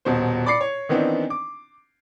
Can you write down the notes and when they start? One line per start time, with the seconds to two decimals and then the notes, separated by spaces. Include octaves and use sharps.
0.05 D#1 B2 C5
0.46 D5 B5 D6 C7 C#7
0.61 C#5
0.89 D#3 E3 B3 C4 D4 D#4
1.30 D6